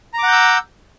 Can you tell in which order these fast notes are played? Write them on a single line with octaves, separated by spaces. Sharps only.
A#5 D6 F#5 G6 E6